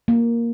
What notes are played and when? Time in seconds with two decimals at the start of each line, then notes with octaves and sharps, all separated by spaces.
0.08 A#3